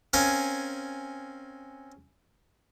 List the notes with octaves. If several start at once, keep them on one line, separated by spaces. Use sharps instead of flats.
C4 C#4 A#4 F5 G#5